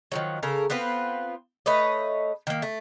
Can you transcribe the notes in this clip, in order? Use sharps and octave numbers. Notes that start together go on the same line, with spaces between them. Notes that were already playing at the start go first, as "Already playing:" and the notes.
D#3 F3 F#3
C#3 A4 A#4
B3 C4 F4 B4
A3 B4 C#5 D#5
D#3 A#3
A3